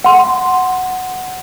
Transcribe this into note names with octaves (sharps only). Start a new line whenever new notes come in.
F#5 C6